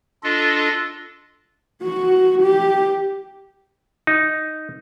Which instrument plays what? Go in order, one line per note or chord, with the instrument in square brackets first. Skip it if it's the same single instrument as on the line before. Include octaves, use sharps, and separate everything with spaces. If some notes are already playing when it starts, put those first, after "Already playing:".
[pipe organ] D4 F4 A4 D#5
[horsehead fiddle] F#4
G4
[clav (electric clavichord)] D#4